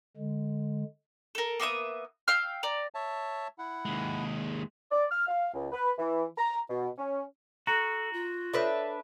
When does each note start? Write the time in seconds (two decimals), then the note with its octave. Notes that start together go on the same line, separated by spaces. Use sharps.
0.17 D3 G#3
1.35 A4 A#4
1.60 A#3 B3 E5 D#6
2.28 F5 G5 E6 F6
2.63 D5 A#5
2.94 C#5 E5 A5
3.58 E4 F#5
3.85 D#2 G#3
4.91 D5
5.11 F6
5.27 F5
5.53 C#2
5.72 B4
5.98 E3
6.37 A#5
6.69 B2
6.98 C#4
7.67 F#4 A4 A#5
8.13 F4
8.54 D4 A4 B4 C#5 E5